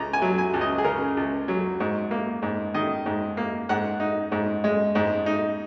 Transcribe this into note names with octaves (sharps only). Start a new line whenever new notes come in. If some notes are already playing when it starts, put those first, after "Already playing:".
Already playing: C#2 A#5
G#5
F#3
G#5
C#2
D#5
G#4
C#3 A#4
C#2
F#3
G#2
A#3
G#2
D#3 D#5
G#2
A#3
G#2 F#5
D#4
G#2
G#3
G#2
D#4